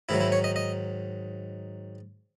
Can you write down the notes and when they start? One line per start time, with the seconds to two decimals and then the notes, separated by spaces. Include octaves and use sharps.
0.09 G#2 D#3 F#3 E4
0.20 E4
0.32 C#5
0.44 D#5
0.56 D#5